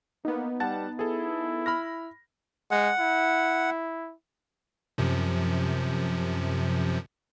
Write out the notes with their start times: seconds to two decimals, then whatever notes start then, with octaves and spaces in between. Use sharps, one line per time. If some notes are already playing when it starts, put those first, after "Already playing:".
0.25 A#3 B3 D#4
0.60 G3 F#5 A5 A6
0.99 E4 G#4 A4
1.66 B5 F6 A#6
2.71 G#3 F#5
2.99 E4
4.98 F#2 C3 F3